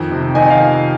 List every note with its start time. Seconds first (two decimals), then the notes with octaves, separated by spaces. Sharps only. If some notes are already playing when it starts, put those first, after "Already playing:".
Already playing: F2 D#3
0.11 C3
0.35 D#3 D#5 G#5
0.50 F5